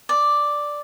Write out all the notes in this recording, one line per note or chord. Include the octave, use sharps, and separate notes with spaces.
D5